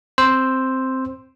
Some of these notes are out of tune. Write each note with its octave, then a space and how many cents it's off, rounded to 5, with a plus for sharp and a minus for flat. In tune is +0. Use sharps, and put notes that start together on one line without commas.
C4 +0 C5 +0 E6 +0